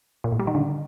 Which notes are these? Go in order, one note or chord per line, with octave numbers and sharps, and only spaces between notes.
A#2
A2
G3
D#3
D3